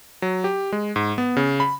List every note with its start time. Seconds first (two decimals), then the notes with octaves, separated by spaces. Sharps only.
0.22 F#3
0.44 G4
0.72 G#3
0.96 G#2
1.18 B3
1.37 C#3
1.60 B5